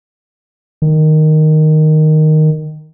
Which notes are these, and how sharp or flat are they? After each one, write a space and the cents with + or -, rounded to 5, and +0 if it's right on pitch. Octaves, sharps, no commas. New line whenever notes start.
D#3 -5